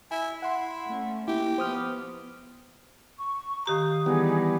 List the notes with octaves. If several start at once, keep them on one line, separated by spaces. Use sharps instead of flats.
E4 G#5
E4 F#5 C6
A3 C#4
A#3 E4 G4
F3 B3 C5 D#6 F6
C#6
D#3 G4 F5 A#5 D#6
E3 G3 B3 D#4 G#4